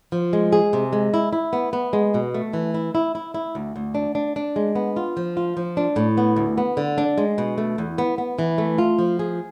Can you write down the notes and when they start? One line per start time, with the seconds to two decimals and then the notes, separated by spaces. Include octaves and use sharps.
0.12 F3
0.33 G#3
0.53 G#4
0.73 C3
0.93 G#3
1.14 E4
1.33 E4
1.53 B3
1.73 B3
1.93 G#3
2.14 B2
2.34 A3
2.53 E3
2.74 E4
2.95 E4
3.15 E4
3.34 E4
3.55 D2
3.76 D2
3.95 D4
4.15 D4
4.36 D4
4.56 G#3
4.75 B3
4.96 F4
5.17 F3
5.37 F4
5.57 F3
5.77 D4
5.96 A2
6.17 B3
6.36 D2
6.58 B3
6.77 D3
6.98 D4
7.18 G#3
7.38 B2
7.58 A3
7.78 E2
7.98 B3
8.18 B3
8.39 E3
8.58 A3
8.78 F4
8.99 F3
9.19 G#4